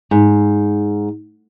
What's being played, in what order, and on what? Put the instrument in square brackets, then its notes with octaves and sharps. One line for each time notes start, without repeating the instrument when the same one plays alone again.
[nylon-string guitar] G#2